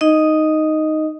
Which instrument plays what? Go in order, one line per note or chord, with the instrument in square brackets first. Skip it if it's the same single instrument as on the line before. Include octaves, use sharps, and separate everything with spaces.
[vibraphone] D#4 D#5